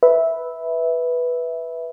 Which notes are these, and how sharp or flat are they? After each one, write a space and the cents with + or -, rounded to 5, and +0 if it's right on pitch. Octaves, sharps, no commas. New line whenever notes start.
B4 +0 E5 -10